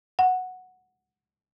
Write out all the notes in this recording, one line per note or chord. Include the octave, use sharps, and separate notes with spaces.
F#5